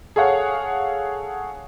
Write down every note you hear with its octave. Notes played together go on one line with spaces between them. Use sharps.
G#4 A4 C#5 F5 F#5